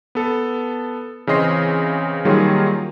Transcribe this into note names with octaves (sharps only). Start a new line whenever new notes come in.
B3 A4
C#3 E3 C4 D#5 C6 C7
D#3 F#3 G3 A#3 F4 G#4